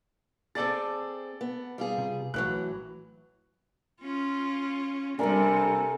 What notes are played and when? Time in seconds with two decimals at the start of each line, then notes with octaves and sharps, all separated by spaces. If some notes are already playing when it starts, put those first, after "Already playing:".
0.55 C4 G#4 A4 D5 A6
1.41 B3
1.78 G3 F4 G#4
1.98 C3
2.34 A#1 A2 E3 F#3 F#6
4.02 C#4 F4
5.19 C3 G3 A#3 D4 A4 A#4 G#5